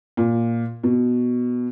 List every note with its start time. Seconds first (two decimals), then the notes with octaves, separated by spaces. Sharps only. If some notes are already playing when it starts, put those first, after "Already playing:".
0.17 A#2
0.83 B2